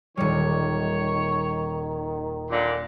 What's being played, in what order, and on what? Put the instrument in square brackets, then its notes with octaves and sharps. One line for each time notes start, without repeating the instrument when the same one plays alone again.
[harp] D#1 G3 [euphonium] D#3 [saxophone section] C#5
[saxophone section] A#2 D3